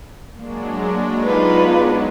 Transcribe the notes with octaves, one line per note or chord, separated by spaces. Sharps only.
F#3 G#3 A#3 D4
B3 D#4 F4 B4